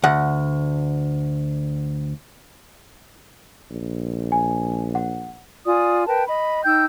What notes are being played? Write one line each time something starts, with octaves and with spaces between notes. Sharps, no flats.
D2 F#5
A#1
G#5
F#5
F4 D5 G#5 D#6
A#4 B4 G5 A5
D#5 B5
D#4 G5 E6 G6